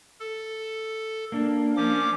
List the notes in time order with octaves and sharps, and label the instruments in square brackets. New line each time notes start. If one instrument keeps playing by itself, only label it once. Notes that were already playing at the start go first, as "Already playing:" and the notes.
[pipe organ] A4
[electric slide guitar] A#3 D4
[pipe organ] F3 C#4 D6